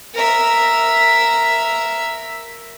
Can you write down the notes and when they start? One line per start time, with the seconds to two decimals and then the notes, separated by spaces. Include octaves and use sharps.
0.15 A#4 E5